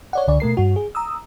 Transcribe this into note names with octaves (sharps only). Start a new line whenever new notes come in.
C#5 D5 F#5
C#2 D3 D5
B2 A3 A#4 C7
G2 F#4
G#4
A#5 D#6 E6